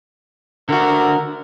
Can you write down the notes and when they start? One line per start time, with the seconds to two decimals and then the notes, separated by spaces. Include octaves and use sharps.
0.69 D3 F#4 A#4